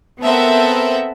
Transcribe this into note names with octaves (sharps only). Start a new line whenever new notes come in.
B3 C4 A4 A#4 E5 F#5